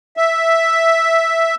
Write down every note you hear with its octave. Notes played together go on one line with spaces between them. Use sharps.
E5